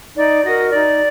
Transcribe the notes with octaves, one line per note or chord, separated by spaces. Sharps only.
D#4 D5
F#4 A#4 D#5
D#4 D5